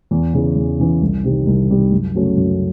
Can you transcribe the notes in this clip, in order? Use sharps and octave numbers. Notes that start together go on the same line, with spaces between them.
E2
C#3 E3
E2
C#3 E3
C2
C3 D#3 G3
C2
C3 D#3 G3
F#2
C#3 F#3 A3 C#4
F#2